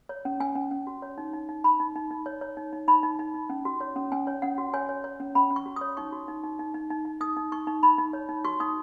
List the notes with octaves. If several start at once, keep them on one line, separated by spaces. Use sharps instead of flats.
C#5
C#4
C#4 G#5
C#4
C#4
F#4
C#5
D#4
D#4
D#4
D#4 B5
D#4
D#4
D#4
C#5
C#5
D#4
D#4
D#4 B5
D#4
D#4
D#4
C#4
F#4
C#5
C#4
C#4 G#5
C#5
C#4 F#5
F#4
C#5 G#5
C#5
C#5
C#4
C#4 B5
C#4
C#6
F#4
D#6
C#5
D#4 C#6
F#4
D#4
D#4
D#4
D#4
D#4
D#4
D#4 D#6
D#4
D#4 C#6
D#4
D#4 B5
D#4
C#5
D#4
F#4 C#6
D#4 D#6